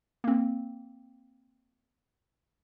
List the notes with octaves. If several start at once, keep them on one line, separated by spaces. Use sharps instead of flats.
A#3 C4